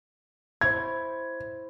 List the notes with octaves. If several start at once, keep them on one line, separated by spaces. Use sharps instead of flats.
E4 C5 C#5 G#6